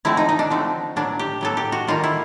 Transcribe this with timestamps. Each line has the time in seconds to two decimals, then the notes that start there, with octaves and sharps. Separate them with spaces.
0.05 D3 F3 A3 C4 E4
0.17 D#4
0.29 D#4
0.39 D4
0.50 D3 F3 A3 C4
0.96 A2 F#3 B3 D4
1.19 G4
1.41 A2 F#3 B3 A4
1.57 G4
1.72 F#4
1.87 D#3 G3 A#3 F4
2.04 E4